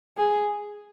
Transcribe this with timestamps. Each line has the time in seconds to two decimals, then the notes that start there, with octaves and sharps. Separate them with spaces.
0.17 G#4